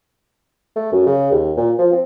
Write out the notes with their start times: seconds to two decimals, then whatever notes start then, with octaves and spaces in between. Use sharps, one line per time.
0.76 A3
0.92 F#2
1.06 C#3
1.32 D#2
1.57 A#2
1.79 F3
1.93 C4